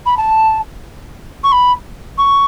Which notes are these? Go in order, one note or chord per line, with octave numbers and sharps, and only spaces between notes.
B5
A5
C#6
B5
C#6